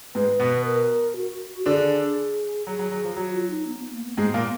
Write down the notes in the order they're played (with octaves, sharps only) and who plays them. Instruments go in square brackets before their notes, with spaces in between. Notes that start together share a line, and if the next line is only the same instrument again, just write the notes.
[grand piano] G#2 G#3 [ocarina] B4
[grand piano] B2 B3
[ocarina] A#4
F#4
[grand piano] D3 D4 [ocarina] G#4
[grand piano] F#3 [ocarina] G#4
[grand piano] F#3
F#3
F3
[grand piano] F#3 [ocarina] F#4
[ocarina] F4
D#4
B3
B3
A#3
B3
[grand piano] G#2 G#3 [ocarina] B3
[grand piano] A#2 A#3